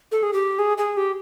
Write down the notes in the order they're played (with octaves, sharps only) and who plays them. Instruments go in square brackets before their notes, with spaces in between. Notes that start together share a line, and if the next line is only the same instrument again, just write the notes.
[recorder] A4
G#4
G4
G#4
G#4
G4